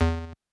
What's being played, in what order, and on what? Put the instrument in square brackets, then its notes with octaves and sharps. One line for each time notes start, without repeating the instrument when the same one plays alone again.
[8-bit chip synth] E2